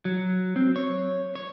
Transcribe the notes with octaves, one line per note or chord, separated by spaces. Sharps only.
F#3
C4
C#5
C#5